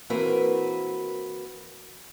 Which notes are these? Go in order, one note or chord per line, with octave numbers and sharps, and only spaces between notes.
E3 A#3 C4 F#4 A#4 B4